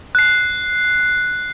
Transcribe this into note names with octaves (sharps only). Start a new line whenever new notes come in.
F#6 C7